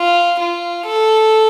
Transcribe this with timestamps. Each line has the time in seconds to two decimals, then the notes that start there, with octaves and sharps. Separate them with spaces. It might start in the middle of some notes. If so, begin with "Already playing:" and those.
Already playing: F4
0.40 F4
0.86 A4